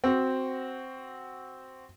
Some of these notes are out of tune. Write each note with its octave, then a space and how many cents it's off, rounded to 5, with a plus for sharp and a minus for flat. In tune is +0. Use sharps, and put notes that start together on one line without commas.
C4 +0 F#4 +10